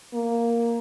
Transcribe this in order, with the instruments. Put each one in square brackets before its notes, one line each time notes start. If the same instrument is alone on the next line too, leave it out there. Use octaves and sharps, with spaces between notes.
[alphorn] A#3